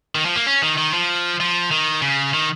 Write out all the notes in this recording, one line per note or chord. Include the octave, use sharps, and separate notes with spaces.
D#3
F3
A#3
C#4
D#3
D#3
F3
F3
D#3
C#3
D#3